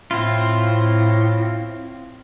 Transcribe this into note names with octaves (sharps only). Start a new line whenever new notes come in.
A2 C4 E4 F4